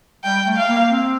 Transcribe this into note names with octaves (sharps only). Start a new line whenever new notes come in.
G3 G5
A3
F5
A#3
C4